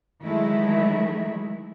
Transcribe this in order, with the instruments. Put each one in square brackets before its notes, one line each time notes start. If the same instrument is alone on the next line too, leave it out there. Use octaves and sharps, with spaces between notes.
[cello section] D#3 E3 F#3 G#3 A3 E4